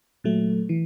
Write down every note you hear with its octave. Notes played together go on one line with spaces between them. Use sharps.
A#2 F#3 A3
E3